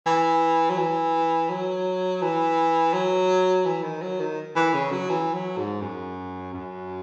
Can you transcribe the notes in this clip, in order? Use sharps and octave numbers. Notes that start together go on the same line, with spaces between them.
E3
F#3
E3
F#3
E3
F#3
E3
D#3
F#3
D#3
E3
C#3
F#3
E3
F#3
G#2
F#2
F#2